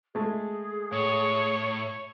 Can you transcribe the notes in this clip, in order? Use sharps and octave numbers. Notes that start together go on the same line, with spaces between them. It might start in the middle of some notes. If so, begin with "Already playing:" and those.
G#3 A3 G#4
A2 C#5